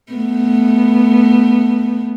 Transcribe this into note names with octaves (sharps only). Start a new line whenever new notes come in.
A3 B3